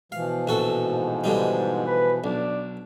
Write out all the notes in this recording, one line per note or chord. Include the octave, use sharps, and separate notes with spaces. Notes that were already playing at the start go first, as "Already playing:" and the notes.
B2 E3 F3 F5
A#1 F#4 A4
G#2
D3 G3 D#4
B4
B1 D4